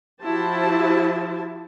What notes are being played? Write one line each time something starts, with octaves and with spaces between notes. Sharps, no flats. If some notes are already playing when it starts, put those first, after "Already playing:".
F3 E4 F#4 G4 C5 A5